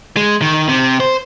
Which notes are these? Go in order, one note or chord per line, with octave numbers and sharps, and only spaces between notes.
G#3
D#3
C3
C5